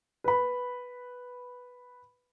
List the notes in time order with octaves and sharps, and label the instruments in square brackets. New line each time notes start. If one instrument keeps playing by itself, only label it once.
[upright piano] B4 B5